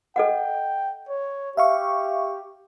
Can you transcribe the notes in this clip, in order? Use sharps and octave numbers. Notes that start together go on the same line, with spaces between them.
A4 D#5 F#5 G5
C#5
G4 E5 F5 C#6